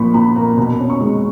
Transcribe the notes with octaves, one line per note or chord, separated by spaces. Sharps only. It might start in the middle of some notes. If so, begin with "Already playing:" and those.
Already playing: A#2 F3 A#3 B5 C#6
A#2 B5
A#3 A#5
B2 B5
C#4
C#6
G#3